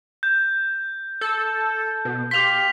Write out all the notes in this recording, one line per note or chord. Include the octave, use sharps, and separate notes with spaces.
G6
A4
B2
G4 F5 C6 B6 F7